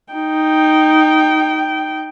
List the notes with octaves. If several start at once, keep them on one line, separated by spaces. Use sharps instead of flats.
D#4 G5